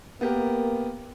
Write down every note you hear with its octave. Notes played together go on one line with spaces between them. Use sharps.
A#3 B3 G4 A#4